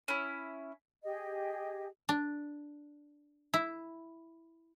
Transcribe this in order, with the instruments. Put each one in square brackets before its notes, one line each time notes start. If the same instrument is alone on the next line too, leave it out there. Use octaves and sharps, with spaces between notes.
[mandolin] C#4 E4
[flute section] G4 G#4 D#5
[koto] D4
E4